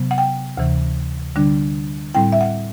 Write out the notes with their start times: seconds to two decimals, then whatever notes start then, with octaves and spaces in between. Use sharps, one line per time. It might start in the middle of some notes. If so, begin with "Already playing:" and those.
Already playing: C3 F#3 B3
0.11 F#5
0.18 G5
0.57 D2 C3 E3
1.36 D3 G3 D4
2.14 A2 G3 C4 E4 G5
2.32 E5
2.41 F#5